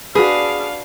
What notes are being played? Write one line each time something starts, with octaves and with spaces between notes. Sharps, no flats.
D4 F#4 G#4 B4 F5